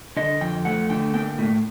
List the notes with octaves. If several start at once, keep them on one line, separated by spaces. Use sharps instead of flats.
D3 D#5
F2 G5
A3 F#5
D3 G5
A#3 G5
A2